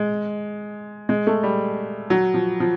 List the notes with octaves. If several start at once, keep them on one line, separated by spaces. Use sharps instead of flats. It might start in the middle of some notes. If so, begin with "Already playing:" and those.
Already playing: G#3
G#3
A3
G3
F#3
F3
F3